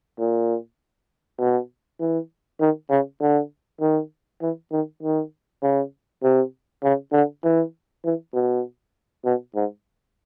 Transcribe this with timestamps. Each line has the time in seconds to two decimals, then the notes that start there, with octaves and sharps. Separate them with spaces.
0.19 A#2
1.39 B2
2.00 E3
2.60 D#3
2.90 C#3
3.21 D3
3.81 D#3
4.42 E3
4.72 D#3
5.03 D#3
5.62 C#3
6.23 C3
6.84 C#3
7.13 D3
7.44 E3
8.04 E3
8.34 B2
9.25 B2
9.55 G#2